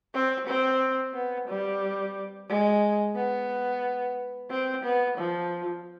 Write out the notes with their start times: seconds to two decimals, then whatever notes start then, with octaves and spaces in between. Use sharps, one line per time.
0.14 C4
0.47 C4
1.14 B3
1.48 G3
2.49 G#3
3.16 B3
4.51 C4
4.84 B3
5.18 F3